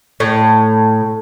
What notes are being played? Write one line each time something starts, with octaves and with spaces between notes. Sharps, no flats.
A2